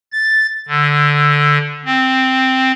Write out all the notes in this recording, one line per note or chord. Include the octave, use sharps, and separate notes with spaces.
A6
D3
C4